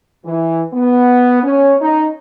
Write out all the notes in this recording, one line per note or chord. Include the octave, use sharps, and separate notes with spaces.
E3
B3
C#4
D#4